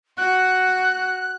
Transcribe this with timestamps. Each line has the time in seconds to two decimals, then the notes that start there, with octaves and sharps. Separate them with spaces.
0.17 F#4 F#6